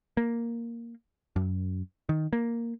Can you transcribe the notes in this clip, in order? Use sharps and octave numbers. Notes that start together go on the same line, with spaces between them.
A#3
F#2
D#3
A#3